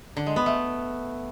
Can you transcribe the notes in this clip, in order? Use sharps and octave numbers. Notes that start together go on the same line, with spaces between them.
D3
G#3
B3
A3